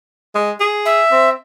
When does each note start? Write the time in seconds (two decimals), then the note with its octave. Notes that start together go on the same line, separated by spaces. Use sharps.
0.35 G#3
0.60 G#4
0.85 E5
1.11 C4